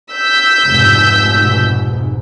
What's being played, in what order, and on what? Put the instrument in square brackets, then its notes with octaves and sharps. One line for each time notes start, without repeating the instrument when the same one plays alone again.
[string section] E6 G6 B6
[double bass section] F1 G#2 B2